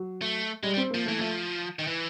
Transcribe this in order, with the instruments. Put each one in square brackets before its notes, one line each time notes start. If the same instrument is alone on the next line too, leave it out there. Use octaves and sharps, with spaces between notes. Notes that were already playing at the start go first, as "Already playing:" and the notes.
Already playing: [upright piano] F#3
[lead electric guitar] A3
[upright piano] G3 [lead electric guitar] G#3
[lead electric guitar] G3
[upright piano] C4
[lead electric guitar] F3 [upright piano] A#3
[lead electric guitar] E3 [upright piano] A3
[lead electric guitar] F3 [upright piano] A3
[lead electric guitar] D#3
E3